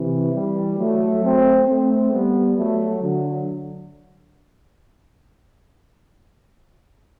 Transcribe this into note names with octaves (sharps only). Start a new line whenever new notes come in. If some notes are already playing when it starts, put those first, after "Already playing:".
Already playing: C3 E3
E3 G3
F#3 A3
A3 C4
A3 C4
G3 B3
F#3 A3
D3 F#3